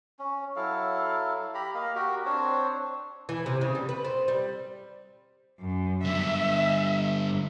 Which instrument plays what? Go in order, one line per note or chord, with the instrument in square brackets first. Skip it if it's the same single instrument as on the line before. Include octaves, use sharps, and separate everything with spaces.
[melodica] C#4
F#3 E4 A4 F5
G4 A#5 B5
A#3 D#5 F5
F#4 G4 A#4
C4 D4 C5 C#5
[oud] E3
C3
C#3
G3
B4
C4
G3
[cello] F#2
[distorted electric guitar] G2 D3 [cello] E5